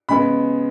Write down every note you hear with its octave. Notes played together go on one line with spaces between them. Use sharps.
C#3 G#3 B3 B5